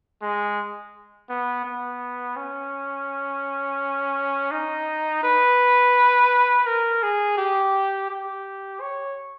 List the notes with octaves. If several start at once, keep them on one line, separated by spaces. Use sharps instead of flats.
G#3
B3
B3
C#4
D#4
B4
A#4
G#4
G4
G4
C#5